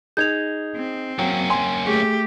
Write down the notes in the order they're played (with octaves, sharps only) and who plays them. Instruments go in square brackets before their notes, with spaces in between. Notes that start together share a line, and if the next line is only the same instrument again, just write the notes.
[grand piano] D#4 G#4 [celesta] G6 G#6 F7
[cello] C4
[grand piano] F#3 [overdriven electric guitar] A#3 C#4 [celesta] G5
[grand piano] G#5 C6
[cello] A3 G4 [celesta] G#4